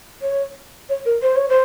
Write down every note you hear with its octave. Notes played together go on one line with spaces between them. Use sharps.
C#5
C#5
A#4
C5
C#5
C5